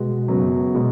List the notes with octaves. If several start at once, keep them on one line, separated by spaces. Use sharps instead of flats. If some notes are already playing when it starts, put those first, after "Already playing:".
Already playing: B2 G#3 B3 F#4
F#2 C#3 F#3 B3
B2 G#3 B3